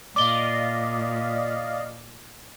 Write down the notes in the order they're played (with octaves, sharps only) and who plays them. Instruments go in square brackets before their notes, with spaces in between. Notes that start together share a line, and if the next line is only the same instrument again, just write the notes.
[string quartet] A#2 [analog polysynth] D5 D#5 F5 [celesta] D6 G7